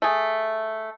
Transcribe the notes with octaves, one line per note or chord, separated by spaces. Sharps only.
A3 G#4